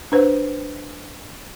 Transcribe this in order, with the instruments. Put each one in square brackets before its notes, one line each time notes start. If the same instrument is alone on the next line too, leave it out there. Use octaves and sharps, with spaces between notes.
[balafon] D4 B4 C5